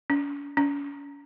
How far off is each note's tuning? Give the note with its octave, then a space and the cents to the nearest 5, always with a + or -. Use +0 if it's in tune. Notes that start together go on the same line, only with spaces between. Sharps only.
C#4 +45
C#4 +40